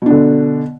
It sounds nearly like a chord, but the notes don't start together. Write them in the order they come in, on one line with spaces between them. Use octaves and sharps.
B2 D4 D3